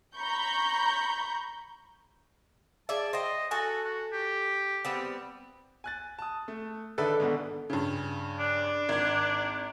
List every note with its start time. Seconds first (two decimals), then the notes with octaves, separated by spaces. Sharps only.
0.16 A#5 B5 C#6 G6
2.89 G#4 D5 E5 A5
3.13 C5 D#5 G5
3.51 F#4 A4 G#5
3.84 F#4
4.12 G4
4.85 G3 B3 C4
5.84 G#5 F#6 A6
6.19 A5 D#6
6.48 A3
6.98 D3 D#3 A4 B4 E5
7.20 G#2 B2 B3
7.70 G2 C#3
8.40 D4
8.89 G#1 G#6